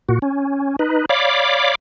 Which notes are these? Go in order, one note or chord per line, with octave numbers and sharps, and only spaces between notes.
A#2 F#4
C#4
D#4 B4
C#5 D5 F5 B5 D6